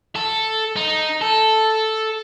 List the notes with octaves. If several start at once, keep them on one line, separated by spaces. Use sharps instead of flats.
A4
D#4
A4